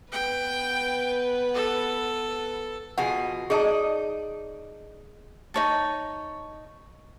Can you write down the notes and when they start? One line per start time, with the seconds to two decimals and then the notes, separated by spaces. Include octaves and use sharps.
0.12 B3 B4 G5
1.55 A4
2.98 B2 F3 G#4 F#5
3.50 D#4 G#4 D5 D#5 A5
5.54 D#4 C#5 A5